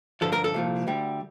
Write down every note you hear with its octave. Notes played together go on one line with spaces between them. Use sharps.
G2 D3 F3 A4
A#4
A4
C2 A#2 F3
D2 D3 G3